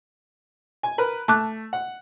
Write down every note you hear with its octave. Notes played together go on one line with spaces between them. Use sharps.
G#5
A#4 B4
A3 A5 D6 F#6
F#5